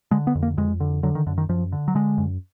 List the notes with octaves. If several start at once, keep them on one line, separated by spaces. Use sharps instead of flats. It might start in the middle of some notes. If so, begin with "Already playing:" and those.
D3 G#3
B3
F2
A#3
F2 G#3
D3
D3 F#3
D#3
F#2 D3
D#3
F#2 F3
D3
F#3
D3 G#3
F#2